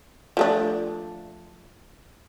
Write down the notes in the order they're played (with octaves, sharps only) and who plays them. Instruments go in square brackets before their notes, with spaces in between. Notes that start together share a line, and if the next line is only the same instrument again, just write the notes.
[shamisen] F3 A3 D4